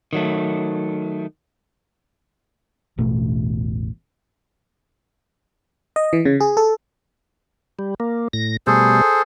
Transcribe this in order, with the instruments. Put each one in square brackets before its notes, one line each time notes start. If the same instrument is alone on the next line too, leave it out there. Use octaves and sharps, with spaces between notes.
[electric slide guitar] D#3 F#3 A3
[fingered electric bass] E1 A1 B2 A3
[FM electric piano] D#5
E3
C#3
G#4
A4
[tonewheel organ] G3
A#3
A2 A#6
[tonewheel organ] B2 G3 A3 [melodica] G#4 A4 C5